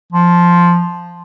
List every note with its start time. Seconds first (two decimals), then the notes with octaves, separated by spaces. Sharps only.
0.13 F3